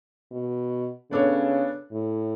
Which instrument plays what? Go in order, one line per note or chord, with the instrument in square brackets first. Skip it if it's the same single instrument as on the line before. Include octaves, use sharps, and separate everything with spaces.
[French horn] B2
[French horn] C#3 [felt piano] B3 D4 A4 C#5
[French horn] A2